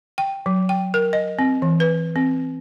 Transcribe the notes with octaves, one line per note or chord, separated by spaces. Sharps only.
G5
F#3
G5
A#4
D#5
C4
E3
B4
C4